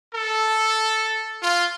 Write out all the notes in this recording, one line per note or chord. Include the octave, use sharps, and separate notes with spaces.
A4
F4